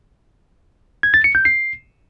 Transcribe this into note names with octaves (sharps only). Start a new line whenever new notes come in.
G#6
A6
C#7
G6
C7